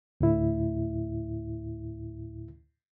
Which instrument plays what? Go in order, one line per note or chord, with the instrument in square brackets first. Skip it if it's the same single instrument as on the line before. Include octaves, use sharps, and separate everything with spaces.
[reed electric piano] D2 A2 E4